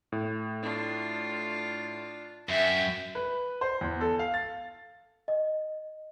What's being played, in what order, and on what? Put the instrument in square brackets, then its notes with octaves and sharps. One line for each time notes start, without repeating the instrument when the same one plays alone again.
[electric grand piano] A2
[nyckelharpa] D4 F4
[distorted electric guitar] F#2 [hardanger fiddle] E5 [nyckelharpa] G5
[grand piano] B4
C5
E2
A4
F5
A6
[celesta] D#5